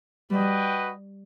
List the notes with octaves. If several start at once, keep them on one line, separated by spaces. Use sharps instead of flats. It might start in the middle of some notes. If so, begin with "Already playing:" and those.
G3 F#4 B4 D#5 G5